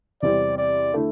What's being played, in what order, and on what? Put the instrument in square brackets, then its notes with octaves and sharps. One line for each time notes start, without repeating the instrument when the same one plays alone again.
[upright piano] E2 C3 G3 C4 [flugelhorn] D5
[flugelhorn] D5
[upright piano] D3 A3 E4